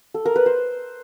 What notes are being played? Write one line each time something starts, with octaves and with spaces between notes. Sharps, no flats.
A4
A#4
B4
C5